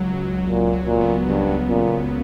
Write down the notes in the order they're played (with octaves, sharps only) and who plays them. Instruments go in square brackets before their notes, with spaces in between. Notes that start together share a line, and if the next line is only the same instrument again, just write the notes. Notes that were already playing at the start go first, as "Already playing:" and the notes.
Already playing: [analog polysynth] C#2 F#3
C#2
[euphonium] A#2 [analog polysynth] F#3
[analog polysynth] F#3
[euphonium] A#2
[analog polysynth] B3
[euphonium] G2 [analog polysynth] C#3
[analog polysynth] F#3
[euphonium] A#2
[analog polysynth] C#2